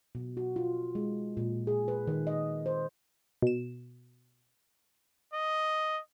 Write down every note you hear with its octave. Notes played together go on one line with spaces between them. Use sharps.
B2
F#4
F4
G#3
A#2
G#4
B4
D#3
D#5
C5
B2 E7
D#5